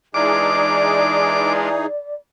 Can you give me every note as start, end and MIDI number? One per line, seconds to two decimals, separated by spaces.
0.14 1.86 52
0.14 1.69 56
0.14 1.69 62
0.14 1.86 63
0.14 1.69 65
0.14 1.86 68
0.14 2.14 74
0.14 1.53 86